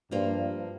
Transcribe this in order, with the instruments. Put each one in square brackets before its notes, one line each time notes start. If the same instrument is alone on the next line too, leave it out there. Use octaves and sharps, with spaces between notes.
[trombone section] G2 [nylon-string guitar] F3 A#3 F4 C5